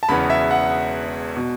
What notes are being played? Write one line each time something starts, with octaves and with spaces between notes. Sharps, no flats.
A5
E1 E2 C#3 E3 B3 B5
E5
F#5
B2